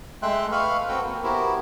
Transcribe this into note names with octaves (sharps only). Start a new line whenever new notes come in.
G#3 A3 E5 G5 C6 F#6
B4 F5 B5 C#6 F6
C4 F#4 A4 B4 G5
A#3
B3 E4 F#4 G4 A#4 C5